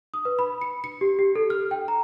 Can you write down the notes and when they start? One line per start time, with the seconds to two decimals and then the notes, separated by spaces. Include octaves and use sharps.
0.14 D#6
0.25 B4
0.39 B5
0.61 C#7
0.84 C#7
1.01 G4
1.19 G4
1.35 A4
1.50 F6
1.71 G5
1.88 A#5